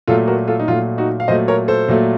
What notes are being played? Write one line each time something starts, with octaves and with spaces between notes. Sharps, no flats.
A#2 F#3 A3 F4 A4
F#4 A#4
F4 A4
D#4
A#2 F#3 A3 F4
D#4 F#4
F5
A#2 F#3 A3 C5 D#5
A#4 C#5
A4 C5
A#2 F#3 A3